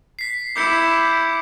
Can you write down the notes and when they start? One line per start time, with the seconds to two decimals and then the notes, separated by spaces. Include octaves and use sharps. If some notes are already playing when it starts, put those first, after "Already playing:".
0.19 B6 C7
0.56 E4 D6 G6 C#7